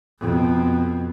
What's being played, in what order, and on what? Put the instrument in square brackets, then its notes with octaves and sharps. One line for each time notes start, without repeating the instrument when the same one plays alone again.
[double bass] F2 B2